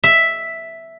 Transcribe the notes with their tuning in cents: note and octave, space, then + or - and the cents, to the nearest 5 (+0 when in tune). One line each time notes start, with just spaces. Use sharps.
E5 +0